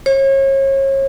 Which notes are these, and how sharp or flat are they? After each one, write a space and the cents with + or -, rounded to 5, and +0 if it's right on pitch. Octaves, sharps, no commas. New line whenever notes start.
C#5 -35